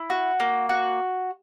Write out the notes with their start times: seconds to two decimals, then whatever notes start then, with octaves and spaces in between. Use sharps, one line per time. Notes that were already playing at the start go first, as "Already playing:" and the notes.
Already playing: E4
0.10 F#4
0.40 A#3
0.69 F#4